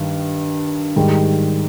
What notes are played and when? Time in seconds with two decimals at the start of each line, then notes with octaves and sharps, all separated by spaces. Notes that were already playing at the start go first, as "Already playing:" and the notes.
Already playing: G2 D#3
0.96 G#2 D#3 G3